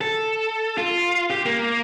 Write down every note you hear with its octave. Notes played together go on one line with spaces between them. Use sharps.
A4
F4
G4
A#3